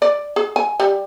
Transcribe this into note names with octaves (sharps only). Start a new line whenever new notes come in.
D5
G#4
G#5
G3